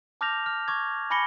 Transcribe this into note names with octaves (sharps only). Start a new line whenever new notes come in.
A5 D6 F6 G6 A#6 F7
F6
C#6 D6 G#6
G#5 B5 D6 A#6 C#7 G7